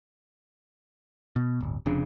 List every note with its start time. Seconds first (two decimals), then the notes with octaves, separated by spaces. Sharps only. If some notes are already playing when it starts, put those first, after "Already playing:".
1.36 B2
1.61 D1 G1
1.86 F1 F2 C#3 D4